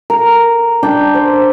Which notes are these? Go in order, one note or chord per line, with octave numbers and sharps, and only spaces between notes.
A#4
D4 D5 G5
C5